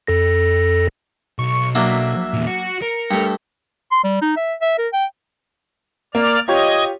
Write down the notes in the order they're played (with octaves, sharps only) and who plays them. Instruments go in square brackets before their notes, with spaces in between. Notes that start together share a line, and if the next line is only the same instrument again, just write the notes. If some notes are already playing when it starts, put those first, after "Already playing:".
[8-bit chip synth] F2 A4 A#6
[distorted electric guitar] B1 [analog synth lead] C#6
[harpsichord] F#3 A#3 D4 [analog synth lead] E5
[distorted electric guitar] E2 A#2
[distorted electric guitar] F#4 [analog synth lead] C#7
[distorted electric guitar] A#4
[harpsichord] G2 A3
[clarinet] C6
G3
D#4
E5
E5
A#4
G5
[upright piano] A#3 [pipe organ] D5 F6
[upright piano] F4 G4 C#5 [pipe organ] D#5 G#6